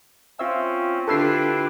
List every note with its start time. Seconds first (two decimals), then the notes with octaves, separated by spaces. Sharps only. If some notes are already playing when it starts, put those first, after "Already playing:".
0.39 C4 C#4 F4 C5 E5
1.08 D3 E4 F4 G4 A4 B4 E6 C7